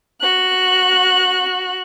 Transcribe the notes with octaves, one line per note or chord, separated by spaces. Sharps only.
F#4 F#6